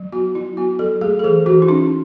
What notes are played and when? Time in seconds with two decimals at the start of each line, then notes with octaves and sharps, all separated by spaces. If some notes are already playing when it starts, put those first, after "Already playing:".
Already playing: F#3
0.12 B3 F#4
0.35 F#3 E4
0.57 B3 F#4
0.79 F#3 A4
1.01 A3 G#4
1.19 A4
1.24 E3 G#4
1.46 E3 F#4
1.62 E4
1.68 C#4 D#4